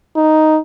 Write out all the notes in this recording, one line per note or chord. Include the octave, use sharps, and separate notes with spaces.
D#4